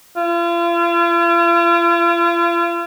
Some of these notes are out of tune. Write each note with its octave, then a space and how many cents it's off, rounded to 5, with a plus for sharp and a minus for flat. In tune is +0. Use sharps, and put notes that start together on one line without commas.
F4 -40